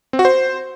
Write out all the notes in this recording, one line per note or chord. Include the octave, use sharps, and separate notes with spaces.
C4
F#4
C5